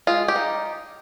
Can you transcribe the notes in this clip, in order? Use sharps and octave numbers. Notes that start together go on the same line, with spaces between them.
G#3 F4
G4
D#4